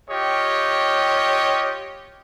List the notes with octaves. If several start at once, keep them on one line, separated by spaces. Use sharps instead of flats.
F4 G4 C#5 D#5 G5